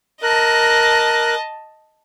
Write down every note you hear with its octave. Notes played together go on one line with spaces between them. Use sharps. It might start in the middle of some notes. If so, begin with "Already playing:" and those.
A#4 D#5 A5 F#6